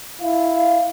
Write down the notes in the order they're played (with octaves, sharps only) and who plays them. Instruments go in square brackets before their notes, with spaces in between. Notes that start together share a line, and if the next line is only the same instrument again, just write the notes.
[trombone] E4 [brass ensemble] F5